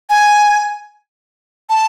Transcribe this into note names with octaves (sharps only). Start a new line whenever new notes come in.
G#5
A5